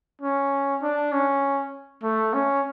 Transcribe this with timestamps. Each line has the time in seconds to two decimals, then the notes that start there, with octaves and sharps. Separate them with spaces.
0.21 C#4
0.82 D4
1.12 C#4
2.03 A3
2.33 C#4